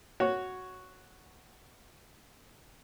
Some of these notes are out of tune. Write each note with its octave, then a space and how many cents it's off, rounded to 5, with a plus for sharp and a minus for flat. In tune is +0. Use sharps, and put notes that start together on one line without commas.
F#4 +0 C#5 +0